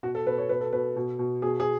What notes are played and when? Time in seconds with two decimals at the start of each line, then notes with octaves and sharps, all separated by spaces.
0.03 B2 F#4
0.15 A4
0.26 B2 B4
0.38 C#5
0.49 B2 B4
0.61 A4
0.72 B2 B4
0.96 B2
1.19 B2
1.42 B2 G#4
1.60 G#4